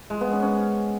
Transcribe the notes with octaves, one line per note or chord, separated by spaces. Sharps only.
G#3
B3
C#4
C#4